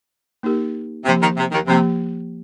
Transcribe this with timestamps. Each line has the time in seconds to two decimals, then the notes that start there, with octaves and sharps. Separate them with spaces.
0.43 A#3 D#4 G4 A#4
1.05 C3 F3 A#3 G4
1.21 D#2 D#3
1.37 C3
1.52 D#2 D#3
1.67 C3 F3 A#3 G4